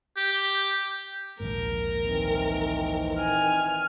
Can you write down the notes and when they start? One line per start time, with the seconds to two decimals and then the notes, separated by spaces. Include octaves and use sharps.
0.17 G4
1.40 A#1 D#2 G#2 A#4
2.02 D#3 E3 C4
3.18 G#5 F6